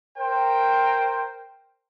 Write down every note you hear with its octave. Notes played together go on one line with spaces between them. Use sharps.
A#4 C5 G5